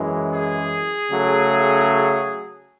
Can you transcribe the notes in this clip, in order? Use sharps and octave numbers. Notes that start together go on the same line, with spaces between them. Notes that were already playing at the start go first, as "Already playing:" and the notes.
Already playing: F#2 E3 G#3
G#4
C#3 F#3 A3